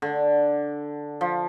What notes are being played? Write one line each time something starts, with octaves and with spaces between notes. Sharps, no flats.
D3
F3